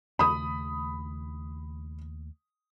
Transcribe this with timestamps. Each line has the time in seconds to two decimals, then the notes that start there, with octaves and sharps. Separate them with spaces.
0.19 D#2 C#3 A3 B5 D#6